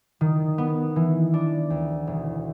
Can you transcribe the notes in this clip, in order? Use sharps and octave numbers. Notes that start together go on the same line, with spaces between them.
D#3
B3
E3
D4
D2
E1